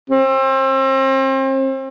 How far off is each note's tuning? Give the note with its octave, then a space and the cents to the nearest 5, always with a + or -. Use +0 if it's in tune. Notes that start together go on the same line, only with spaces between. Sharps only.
C4 +35